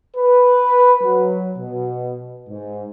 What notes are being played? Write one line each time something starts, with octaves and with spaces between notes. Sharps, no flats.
B4
F#3
B2
G#2